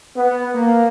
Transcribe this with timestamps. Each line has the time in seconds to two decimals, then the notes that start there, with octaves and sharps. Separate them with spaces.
0.15 B3
0.54 A#3